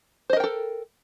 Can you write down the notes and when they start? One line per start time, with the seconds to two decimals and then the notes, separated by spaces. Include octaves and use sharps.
0.30 C5
0.33 D#5
0.37 A#4
0.40 G5
0.44 A4